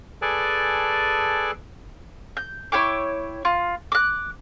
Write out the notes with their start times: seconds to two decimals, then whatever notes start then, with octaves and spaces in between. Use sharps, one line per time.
0.22 G#4 A4 B4 D5 G#5 A5
2.37 G6
2.72 E4 C#5 G5 D6
3.45 F4
3.92 D6 F#6